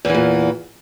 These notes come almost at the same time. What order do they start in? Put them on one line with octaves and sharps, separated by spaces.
E2 E3 A#2